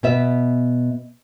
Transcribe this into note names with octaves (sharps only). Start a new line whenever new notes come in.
B2 B3 E5